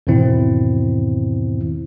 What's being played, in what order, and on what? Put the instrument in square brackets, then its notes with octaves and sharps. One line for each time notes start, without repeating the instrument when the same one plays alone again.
[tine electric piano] E2 G#2 B2 D#3 C4 E4